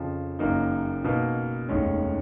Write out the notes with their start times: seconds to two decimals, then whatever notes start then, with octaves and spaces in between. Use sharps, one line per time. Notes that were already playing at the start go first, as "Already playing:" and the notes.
Already playing: F2 C#3 F3
0.39 F#1 F#2 D#3 A#3 D#4
1.04 B2 A#3 D#4
1.69 F1 D#2 D#3 G#3 C#4